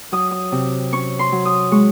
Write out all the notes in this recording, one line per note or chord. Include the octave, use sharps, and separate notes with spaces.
F#3 D#6
D#6
C3
C#4 C#6
C6
F#3
D#6
G#3 C#6